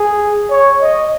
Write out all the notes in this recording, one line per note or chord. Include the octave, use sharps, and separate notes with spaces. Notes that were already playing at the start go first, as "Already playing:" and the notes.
Already playing: G#4
C#5
D#5